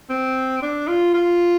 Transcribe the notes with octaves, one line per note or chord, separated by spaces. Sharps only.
C4
D4
F4
F4